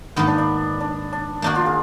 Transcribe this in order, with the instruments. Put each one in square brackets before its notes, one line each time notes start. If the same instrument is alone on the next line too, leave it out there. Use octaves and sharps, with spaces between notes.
[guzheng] G#2 D#3 A#3 D#4 [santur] B3
[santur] D4
D4
D4
D4
[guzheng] D#3 A#3 D#4 F#4 A#4 [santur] D4
[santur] D4 F4
F4 G#4